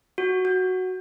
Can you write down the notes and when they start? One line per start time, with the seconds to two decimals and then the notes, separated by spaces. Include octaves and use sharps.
0.18 F#4
0.45 F#4